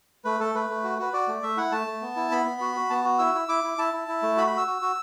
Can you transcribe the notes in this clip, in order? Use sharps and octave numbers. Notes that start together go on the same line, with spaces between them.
A3 B4
A3 A4
A3 B4
A3
F#4
F#4 B4
F#4 D5
A3
A3 E5
E4 F#5
A3 A5
A3
B3
E4
B3 B5
B3
F#4
F#4
B3 A5
F#4
E4 E6
E4
E4 D6
E4
E4 A5
E4
E4
A3
F#4 B5
F#4 B5
E6
F#4
F#4